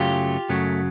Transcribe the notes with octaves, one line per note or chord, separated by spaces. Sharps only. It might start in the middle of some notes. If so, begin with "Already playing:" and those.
Already playing: F#2 C#3 F#3 A3 F4 G4
F#2 C#3 F#3 A3